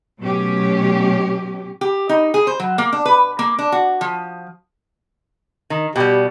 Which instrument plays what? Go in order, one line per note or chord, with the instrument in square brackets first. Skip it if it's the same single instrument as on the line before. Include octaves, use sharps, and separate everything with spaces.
[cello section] B2 F#3 A3 C#4 G4
[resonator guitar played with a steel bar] G4
D#4
G#4
C5
F#3
A#3
D4
B4
A#3
D4
F#4
F3
D#3
[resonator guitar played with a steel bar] B2 G3 [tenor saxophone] G4